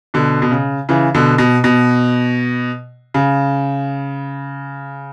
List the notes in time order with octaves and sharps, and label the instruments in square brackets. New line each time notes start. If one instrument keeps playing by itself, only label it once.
[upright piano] B2 D3
B2
C#3
C#3 E3
B2 D3
B2
B2
C#3